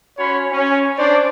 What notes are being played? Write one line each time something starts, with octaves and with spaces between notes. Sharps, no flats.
C#4 F#4 C#5 B5 C6
C#4
D4 C5 D5